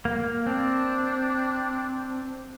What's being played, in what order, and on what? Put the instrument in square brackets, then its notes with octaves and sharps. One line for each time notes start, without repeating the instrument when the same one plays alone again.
[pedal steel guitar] A#3
[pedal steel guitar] C4 [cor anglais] D4